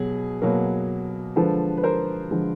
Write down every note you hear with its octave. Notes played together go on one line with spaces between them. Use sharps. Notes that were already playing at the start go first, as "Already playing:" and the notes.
Already playing: B2 F#3 G#4
B2 F#3 A#3
D3 F3 G#3 A4 B4
B4
A#4 C5
D3 F3 G#3